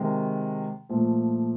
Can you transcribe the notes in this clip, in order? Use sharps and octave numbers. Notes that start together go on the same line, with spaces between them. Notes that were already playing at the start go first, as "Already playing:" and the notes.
Already playing: C3 D#3 G#3
A#2 F3 A3